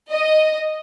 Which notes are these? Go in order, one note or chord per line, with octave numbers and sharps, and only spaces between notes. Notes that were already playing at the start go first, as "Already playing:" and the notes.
D#5